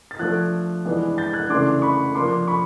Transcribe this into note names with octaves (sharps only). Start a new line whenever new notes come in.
A6
F3 A3 D4 F#6 G#6
E3 G#3 B3 D4
G6 A6
F#6 G#6
C#3 E3 A3 D4 C6 D6
B5 C#6
F3 A#3 D4 C6 D6
B5 C#6